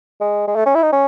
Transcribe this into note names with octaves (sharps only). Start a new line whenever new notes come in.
G#3
G#3
A3
C#4
E4
D#4
C#4